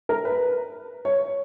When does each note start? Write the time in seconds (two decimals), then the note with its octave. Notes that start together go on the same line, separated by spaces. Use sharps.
0.09 A#4
0.25 B4
1.05 C#5